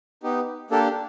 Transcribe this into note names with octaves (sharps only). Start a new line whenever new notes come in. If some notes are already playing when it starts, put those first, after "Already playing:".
B3 D#4 G4
A#3 D4 G4 A4